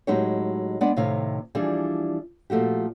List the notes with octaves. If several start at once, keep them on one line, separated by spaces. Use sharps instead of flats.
A2 F#3 G#3 D#4 G4 C#5
G#3 B3 D4 D5 F#5
A2 C3 D#3 C#5 F5
E3 F3 G3 D4 G#4
A#2 F3 A3 F#4 G4